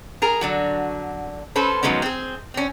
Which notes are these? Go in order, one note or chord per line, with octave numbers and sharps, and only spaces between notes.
G#4 A#4
D3 F#3 F#4
C#4 A4 B4 C5
D#3 F3 F#3 G#3 B3 C#4
C4 G#4
C4 C#4